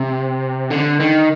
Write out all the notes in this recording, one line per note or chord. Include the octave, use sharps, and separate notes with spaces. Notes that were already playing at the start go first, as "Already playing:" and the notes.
Already playing: C3
D3
D#3